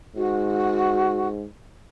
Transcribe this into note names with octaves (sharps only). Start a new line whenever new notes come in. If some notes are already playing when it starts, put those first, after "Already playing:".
G#2 F#4